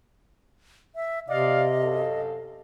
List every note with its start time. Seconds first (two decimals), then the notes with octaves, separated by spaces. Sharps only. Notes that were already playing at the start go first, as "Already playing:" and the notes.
0.95 E5
1.28 C3 D5 D#5 F5
1.81 F#2 A4 F5